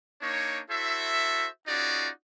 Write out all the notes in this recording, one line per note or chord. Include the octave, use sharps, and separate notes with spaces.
A#3 D4 D#4 C#5
E4 F#4 A4 C5 E5
C#4 D#4 F4 F#4 G#4 D5